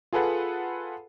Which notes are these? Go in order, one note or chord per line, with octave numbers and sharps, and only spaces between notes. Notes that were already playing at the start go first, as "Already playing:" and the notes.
F4 G#4 A4 B4 F#5